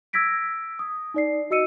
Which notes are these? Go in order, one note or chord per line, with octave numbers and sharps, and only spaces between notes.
E6 G#6 A#6 B6 D7
D#6
D#4 D5 C7
F#4 D#5 E6 C#7 D#7